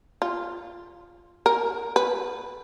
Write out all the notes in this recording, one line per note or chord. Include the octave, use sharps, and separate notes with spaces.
F4
A#4
B4